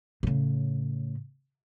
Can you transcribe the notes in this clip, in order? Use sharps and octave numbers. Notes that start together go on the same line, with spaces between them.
A2 C#3